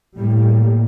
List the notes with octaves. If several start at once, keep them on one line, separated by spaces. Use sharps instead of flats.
A2 G3 A#3